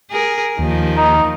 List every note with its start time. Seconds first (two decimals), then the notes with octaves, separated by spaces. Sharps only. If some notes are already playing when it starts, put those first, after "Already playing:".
0.11 G#4 A#4
0.59 D#2 D#3 F3
0.97 D#4